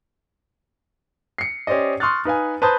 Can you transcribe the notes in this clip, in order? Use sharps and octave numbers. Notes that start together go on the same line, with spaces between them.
C7 C#7
C#4 G4 C5 D5 D#5
C6 C#6 D#6 F6 F#6 A6
D#4 B4 F5 G#5
B4 C5 A5 A#5 D#6 G6